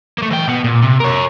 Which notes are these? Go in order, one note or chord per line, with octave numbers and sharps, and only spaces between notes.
A3 A#3
E3 G5
B2 B3
A#2
C3
A#4 C#5